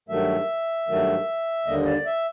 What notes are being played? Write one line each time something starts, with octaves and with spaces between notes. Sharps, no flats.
G2 D#3 F#3 A3 E5
G2 D#3 F#3 A3
D#2 D3 G3 A#3 D#5
D5
E5